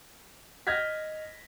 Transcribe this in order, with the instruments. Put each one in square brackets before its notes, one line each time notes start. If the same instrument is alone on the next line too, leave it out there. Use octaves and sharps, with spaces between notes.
[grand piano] D#5 F6 G6 G#6 A#6 B6